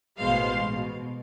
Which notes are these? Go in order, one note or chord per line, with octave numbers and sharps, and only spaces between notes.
A1 B2 G#3 C5 F5 C6
B2